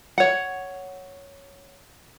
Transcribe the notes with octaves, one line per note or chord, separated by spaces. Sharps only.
C#5 F#5